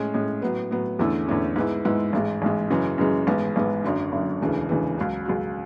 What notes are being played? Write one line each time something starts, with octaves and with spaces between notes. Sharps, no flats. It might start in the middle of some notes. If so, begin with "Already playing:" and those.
Already playing: A2 G#3 C#4
A2 G#3 C#4
A2 F#3 B3
A2 F#3 B3
E2 D3 A3 C#4 E4
E2 D3 A3 C#4 E4
G#2 G#3 B3 E4
G#2 G#3 B3 E4
A1 G#2 G#3
A1 G#2 G#3
F#2 C#3 E3 G#3 C#4
F#2 C#3 E3 G#3 C#4
A1 G#2 G#3 B3
A1 G#2 G#3 B3
F#1 F#2 D3
F#1 F#2 D3
E1 D2 C#3 E3
E1 D2 C#3 E3
C#2 C#3 F#3
C#2 C#3 F#3